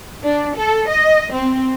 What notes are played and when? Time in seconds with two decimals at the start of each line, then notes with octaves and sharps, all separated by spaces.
0.23 D4
0.57 A4
0.89 D#5
1.33 C4